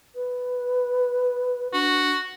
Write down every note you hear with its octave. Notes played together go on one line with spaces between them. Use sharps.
B4
D4 F#4